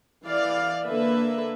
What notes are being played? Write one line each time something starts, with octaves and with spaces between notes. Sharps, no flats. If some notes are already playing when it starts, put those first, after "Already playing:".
E3 D5 F5
D3 A#3 A4 B4 E5